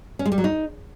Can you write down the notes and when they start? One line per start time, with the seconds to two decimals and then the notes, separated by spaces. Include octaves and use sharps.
0.19 C#4
0.26 G#3
0.32 G3
0.38 F#3
0.44 D#4